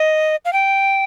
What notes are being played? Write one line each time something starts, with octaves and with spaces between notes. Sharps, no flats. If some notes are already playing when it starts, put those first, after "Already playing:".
Already playing: D#5
F5
G5